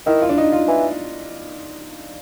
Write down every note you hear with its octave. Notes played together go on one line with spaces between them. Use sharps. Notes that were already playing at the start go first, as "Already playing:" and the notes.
D#3 E4
F4
D4
D#4
F4
E3